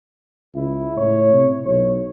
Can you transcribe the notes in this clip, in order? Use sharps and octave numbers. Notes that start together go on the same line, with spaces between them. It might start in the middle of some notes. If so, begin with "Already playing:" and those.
C#2 E4
A2 C#5
C3
B1 C#5